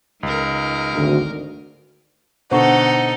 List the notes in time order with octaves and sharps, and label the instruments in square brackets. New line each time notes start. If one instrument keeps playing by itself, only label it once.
[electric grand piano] C#2 [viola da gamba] D#4 A#4
[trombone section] G#1 D2
[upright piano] B2 D3 [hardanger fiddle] D#4 A4 [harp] C5 C#6 [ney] F#5